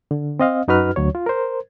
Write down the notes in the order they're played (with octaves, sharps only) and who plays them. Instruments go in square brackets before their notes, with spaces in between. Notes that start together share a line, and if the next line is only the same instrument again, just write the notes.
[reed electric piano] D3
C4 D#5 F5
F#2 D#4 F#4 B4 F6
D2 F#3 C#5
F4
A#4 C5